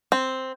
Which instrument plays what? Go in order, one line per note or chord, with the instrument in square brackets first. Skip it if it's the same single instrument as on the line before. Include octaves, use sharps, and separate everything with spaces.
[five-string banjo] C4